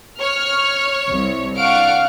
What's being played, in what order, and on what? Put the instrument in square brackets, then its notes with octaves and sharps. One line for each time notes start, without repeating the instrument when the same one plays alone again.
[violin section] C#5 [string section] F6
[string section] C2
[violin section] D4 C#6 D7 [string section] F5 F#5 F6